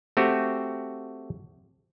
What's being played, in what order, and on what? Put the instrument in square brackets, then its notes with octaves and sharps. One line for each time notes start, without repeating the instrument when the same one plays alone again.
[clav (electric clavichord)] A3 C4 F#4 G4